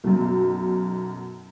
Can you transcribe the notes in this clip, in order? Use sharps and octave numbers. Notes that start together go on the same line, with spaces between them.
B1 F#2